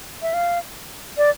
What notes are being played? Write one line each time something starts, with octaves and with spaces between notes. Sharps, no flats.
E5
F5
D5